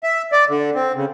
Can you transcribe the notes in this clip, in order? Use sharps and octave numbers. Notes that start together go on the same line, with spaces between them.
E5
D5
D3
C4
C#3